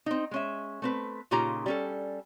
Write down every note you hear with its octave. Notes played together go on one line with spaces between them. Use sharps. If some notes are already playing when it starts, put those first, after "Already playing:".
C4 D#4
G#3 C#4 E5
A3 C4 B4
A#2 C#3 D#4 F4 G4 A#5
G3 C#4 A4